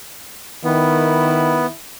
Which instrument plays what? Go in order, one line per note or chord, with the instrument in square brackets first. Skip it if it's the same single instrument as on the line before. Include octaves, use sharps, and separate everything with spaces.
[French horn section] D#3 [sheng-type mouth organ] B3 [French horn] E4